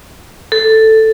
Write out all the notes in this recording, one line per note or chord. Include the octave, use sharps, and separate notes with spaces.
A4